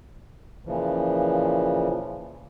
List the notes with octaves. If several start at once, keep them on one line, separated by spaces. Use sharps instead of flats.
A#2 C#3 E3 F3